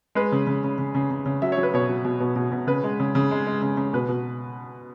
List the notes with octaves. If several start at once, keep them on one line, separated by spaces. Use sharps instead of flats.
G#3 B4
C#3
C#3
C#3
C#3
C#3
C#3
C#3
F#3 E5
C#5
F#3
B4
B2 C#5
F#3
B2
B2
B2
B2
C#3 B4
G#3
C#3
C#3
G#3
G#3
C#3
C#3
B2 B4
B2